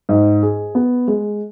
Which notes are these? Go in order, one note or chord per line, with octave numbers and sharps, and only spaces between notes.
G#2
G#4
B3
G#3